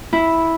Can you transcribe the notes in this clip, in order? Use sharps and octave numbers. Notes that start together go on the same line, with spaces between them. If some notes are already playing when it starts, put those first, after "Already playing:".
E4